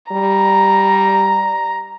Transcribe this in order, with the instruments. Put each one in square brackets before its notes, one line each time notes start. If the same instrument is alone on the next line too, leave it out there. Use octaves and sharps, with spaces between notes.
[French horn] G3 [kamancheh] A#5